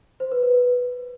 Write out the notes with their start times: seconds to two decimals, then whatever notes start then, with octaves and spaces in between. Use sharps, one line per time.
0.20 C5
0.32 B4
0.43 B4